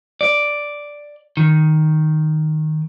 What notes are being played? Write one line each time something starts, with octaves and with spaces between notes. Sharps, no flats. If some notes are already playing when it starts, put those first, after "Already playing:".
D5
D#3